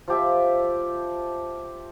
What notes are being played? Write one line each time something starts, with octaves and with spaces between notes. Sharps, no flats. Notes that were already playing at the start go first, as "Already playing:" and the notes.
F3 G4 E5